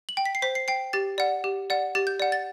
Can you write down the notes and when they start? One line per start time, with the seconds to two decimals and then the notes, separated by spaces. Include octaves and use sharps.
0.09 F#7
0.17 G5
0.25 B6
0.35 C7
0.42 C5 B6
0.55 C7
0.68 G5 C7
0.93 G4 A6
1.18 D5 F#5
1.44 G4
1.70 D5 F#5
1.95 G4 A6
2.07 G6
2.20 D5 F#5
2.32 A6